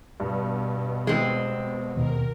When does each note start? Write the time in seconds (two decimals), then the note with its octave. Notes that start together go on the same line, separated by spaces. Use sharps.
0.20 G2 B2
1.07 G#3 C4
1.96 D#2 B2 A#4